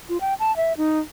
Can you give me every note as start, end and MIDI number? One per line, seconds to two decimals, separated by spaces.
0.09 0.18 65
0.21 0.34 79
0.40 0.55 81
0.57 0.73 76
0.78 0.99 63